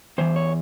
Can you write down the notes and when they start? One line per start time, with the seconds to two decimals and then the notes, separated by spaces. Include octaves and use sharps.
0.18 E2 E3 C5
0.36 C#5